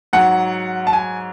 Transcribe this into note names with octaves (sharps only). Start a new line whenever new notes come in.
G#2 F#3 F#5
A5
G#5